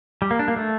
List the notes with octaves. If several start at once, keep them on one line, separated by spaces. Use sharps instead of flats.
G3
A#3
D4
A#3
A3